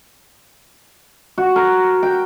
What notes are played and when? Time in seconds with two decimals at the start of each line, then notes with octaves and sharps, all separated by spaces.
1.38 F#4
1.56 A#4
2.03 G5